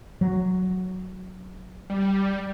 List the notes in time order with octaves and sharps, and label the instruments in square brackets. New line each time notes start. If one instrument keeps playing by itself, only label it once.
[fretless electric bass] F#3
[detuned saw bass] G3